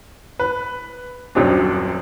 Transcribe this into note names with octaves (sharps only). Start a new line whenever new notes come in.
B4
D#1 F#2 F#3 C4 D4